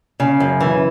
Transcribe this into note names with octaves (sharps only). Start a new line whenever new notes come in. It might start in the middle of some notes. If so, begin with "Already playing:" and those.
C#3
F#2
E3